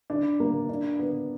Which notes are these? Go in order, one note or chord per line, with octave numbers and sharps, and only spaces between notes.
D4
A#3
D4
B3